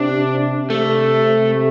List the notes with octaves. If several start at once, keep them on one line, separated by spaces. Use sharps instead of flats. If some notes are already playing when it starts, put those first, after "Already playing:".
Already playing: C3 D4
C3 A3
C3